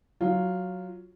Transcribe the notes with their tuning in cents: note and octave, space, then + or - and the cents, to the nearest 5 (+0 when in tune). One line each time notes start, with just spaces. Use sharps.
F#3 +0 F4 +0